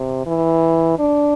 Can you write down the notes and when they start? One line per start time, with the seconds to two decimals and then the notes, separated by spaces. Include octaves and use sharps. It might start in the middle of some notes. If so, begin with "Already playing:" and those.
Already playing: C3
0.26 E3
0.99 D4